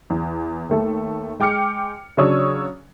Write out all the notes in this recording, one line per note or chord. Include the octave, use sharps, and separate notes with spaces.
E2
D#2 A3 A4
G#3 G5 D6 F6 C#7
C#3 F#3 D4 C#5 D#6 E6